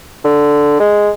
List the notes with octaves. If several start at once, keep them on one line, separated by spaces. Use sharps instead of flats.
D3
G#3